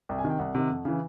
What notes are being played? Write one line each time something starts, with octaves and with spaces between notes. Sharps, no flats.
C2 G5
G#5
C3 D#3
G5
C2 F#5
C3 D#3
F2
C#3 E3